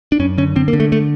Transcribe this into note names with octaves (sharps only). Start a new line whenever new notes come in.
D4
F#2 C#4
D3 C#4
D3 C4
A#3
D3
A3
A3